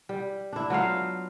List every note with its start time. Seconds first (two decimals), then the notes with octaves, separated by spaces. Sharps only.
0.09 G3
0.53 D4 E4
0.70 F#3 B3 F4 F5